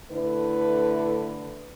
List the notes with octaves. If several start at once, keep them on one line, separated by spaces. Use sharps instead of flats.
D3 A3 E4 B4